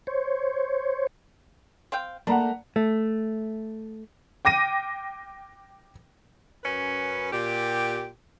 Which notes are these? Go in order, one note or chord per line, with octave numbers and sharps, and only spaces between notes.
C5 C#5
C4 F5 G5
A3 A#3 D4 F#5 A#5 B5
A3
G5 D6 A#6 D#7
F#2 C#4 B4
A#2 G4